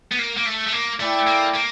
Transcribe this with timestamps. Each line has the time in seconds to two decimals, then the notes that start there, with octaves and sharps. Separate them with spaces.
0.12 B3
0.18 A#3
0.37 A#3
0.46 A3
0.67 A3
0.72 A#3
0.99 A3 E4 A4 D5 G5
1.27 A#3
1.54 A#3